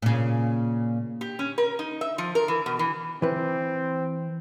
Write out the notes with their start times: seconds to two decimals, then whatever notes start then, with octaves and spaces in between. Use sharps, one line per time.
0.02 A#2 C#3
1.21 G4
1.39 C#4
1.58 A#4
1.79 D#4
2.01 E5
2.18 F3
2.35 A#4
2.48 E3
2.66 B2
2.79 E3
3.22 E3 C4 B4